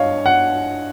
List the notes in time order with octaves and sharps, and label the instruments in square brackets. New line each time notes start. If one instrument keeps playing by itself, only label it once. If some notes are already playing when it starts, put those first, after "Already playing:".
Already playing: [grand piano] G2 C#5 D#5 F5
F#5